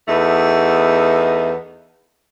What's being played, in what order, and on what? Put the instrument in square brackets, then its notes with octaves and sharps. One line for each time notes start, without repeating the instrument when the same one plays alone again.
[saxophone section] E2 A3 B3 D#4